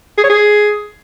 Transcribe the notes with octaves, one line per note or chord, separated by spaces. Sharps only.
G#4
C#5
G#4